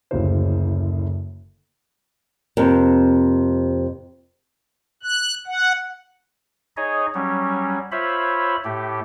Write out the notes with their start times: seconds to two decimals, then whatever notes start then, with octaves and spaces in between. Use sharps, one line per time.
0.11 F#1 D2 A2 C#3 F#4 C5
2.57 F2 C3 A#3
5.03 F#6
5.47 F#5
6.77 D#4 G#4 C#5 D#5
7.14 F#3 G3 C#4
7.92 F4 C5 C#5 E5 B5
8.65 A2 A3 G4